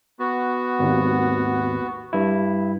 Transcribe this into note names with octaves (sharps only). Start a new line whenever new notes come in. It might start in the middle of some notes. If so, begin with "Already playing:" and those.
B3 F#4
G#1 D#2
G2 E4